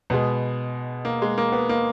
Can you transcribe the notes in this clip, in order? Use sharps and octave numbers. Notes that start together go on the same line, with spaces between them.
B2 G#3 B3
A#3
G#3
A#3
B3
A#3